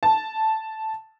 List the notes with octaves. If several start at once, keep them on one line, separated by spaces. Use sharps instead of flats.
A5